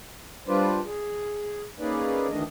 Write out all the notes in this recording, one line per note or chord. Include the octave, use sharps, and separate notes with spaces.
G3 D4 F4 B4 C5 D5
G#4
A#3 C#4 D#4 G#4 B4 D5
D2 D#3 E3 A3 D4 D#5